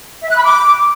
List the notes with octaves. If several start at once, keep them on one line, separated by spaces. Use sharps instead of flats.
E5
F#6
B5
D6